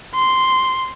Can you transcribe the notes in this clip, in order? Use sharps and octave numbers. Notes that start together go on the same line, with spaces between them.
C6